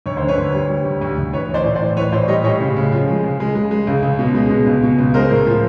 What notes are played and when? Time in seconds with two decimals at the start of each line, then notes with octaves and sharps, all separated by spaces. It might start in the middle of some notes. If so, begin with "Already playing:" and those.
0.06 D2 C#5
0.17 D3 C5
0.28 B4 C#5
0.38 D2
0.53 G3
0.70 G3
0.85 D2
1.01 D2
1.17 D2
1.33 E3 B4 C#5
1.49 E3
1.54 C5 D5
1.64 A2
1.75 C5 D5
1.81 E3
1.96 E3 B4 C#5
2.12 A2 C5 D5
2.28 G3 C#5 D#5
2.44 A2 C#5 D#5
2.60 C#3
2.77 C#3
2.92 F3
3.07 G#3
3.24 C#3
3.40 G#3
3.55 G#3
3.71 G#3
3.87 C#2
4.03 C#2
4.19 B2
4.34 G#3
4.50 B2
4.67 C#2
4.83 B2
4.99 C#2
5.14 G#3 A#4 C5
5.30 A2
5.46 F3